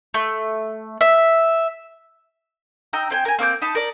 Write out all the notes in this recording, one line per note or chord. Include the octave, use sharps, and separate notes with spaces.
A3
E5
D#4 G5 A#5 E6
C4 G5 G#5
A#4 G#5
A#3 C4 D6 G6
D#4 A5 B5
A#4 D5